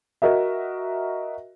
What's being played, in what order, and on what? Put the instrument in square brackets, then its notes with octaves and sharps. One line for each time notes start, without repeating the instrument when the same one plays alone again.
[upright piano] F#4 A#4 D#5 E5